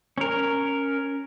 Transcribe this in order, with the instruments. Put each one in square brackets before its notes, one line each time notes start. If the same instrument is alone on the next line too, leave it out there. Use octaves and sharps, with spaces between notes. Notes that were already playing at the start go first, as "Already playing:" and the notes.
[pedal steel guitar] C#4 A#4